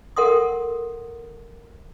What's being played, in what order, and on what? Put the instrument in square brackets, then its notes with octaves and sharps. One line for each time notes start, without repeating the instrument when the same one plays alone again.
[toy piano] A4 A#4 F#5 C6 D#6